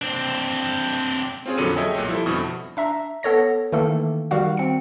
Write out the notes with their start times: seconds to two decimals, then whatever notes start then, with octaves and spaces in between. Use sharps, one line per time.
0.02 C4 D4
1.46 C4 C#4 F4 G#4 C#5
1.58 F2 A#2 D3 F#3 D#7
1.76 G#4 A4 C#5 D#5 E5 G5
1.95 B1 A#2
2.08 F3 G3 E4 A4
2.26 F2 B2 D3 E4 C#6 D#6
2.77 D4 E5 A#5
3.23 B3 A4 C#5 A#6
3.72 D#3 E3 A3 A#3 A4
4.31 D#3 G3 F#4 F5 F#5
4.57 C4 C#7